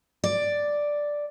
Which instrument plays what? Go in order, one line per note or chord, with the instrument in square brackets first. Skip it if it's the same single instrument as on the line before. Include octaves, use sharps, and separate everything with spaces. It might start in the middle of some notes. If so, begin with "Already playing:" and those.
[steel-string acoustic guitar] D5